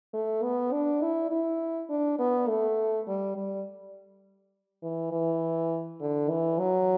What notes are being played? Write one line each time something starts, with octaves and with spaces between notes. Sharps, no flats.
A3
B3
D4
E4
E4
D4
B3
A3
G3
G3
E3
E3
D3
E3
F#3